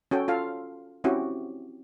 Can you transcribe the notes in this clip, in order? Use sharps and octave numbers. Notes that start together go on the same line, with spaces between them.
C#4 F#4 A4 G5
F4 A4 F5
C4 C#4 E4 F#4 G4